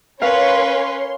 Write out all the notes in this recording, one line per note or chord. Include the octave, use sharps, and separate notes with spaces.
C#4 A#4 B4 C#5 F5 C6